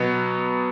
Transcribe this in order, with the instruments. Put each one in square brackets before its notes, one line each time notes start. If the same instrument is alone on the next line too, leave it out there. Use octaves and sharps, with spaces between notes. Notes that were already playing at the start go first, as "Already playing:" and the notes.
Already playing: [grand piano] B2 F#3 B3